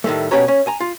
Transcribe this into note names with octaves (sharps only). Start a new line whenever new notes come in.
A2 D#3 G3 A3
B2 C#4 G4 B4 C#5 A#5
C#4
G#5 A#5
F4